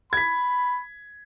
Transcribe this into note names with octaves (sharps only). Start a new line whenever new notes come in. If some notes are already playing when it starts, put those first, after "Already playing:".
B5 G#6 B6